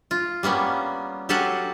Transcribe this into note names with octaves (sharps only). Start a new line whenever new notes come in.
F4
G3 A#3 B3 C#4
F#3 G4 A4 F5 F#5 G#5